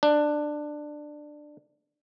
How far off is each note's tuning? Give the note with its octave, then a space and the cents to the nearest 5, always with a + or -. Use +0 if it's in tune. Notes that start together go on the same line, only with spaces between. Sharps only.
D4 +15